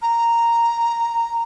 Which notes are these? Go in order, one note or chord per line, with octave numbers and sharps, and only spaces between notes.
A#5